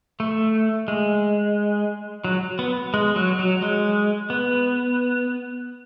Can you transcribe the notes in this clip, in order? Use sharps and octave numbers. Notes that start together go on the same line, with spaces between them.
A3
G#3
F#3
B3
G#3
F#3
F#3
G#3
B3